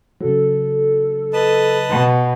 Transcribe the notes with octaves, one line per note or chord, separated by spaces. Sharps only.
C#3 F#3 A4
B4 D#5 A5
B2